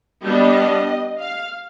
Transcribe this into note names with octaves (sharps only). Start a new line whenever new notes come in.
G3 B3 D4 D#5
F5